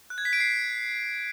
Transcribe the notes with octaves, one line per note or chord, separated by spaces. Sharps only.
F#6
G#6
B6
D7
C7